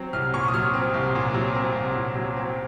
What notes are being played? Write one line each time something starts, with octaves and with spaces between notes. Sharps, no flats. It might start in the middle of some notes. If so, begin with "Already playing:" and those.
Already playing: F#3 C4
C2 F6
A#2 C#6
D#6
F#3 F6
C4
C2
A#2
F#3
C4
C2
A#2
F#3
C4